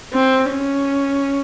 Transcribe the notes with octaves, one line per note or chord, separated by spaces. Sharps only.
C4
C#4